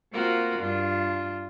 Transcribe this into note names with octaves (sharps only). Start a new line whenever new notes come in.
A#3 C4 F4 F#4 A#4
G2 D4 F4